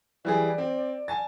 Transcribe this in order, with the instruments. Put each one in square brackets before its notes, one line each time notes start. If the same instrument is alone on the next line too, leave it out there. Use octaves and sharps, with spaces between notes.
[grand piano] E3 G3 G#4 [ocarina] D5
[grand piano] C4
G#5 A5 A6